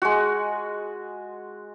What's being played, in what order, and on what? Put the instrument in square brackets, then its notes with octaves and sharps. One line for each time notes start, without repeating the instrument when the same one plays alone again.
[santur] G#3 F#4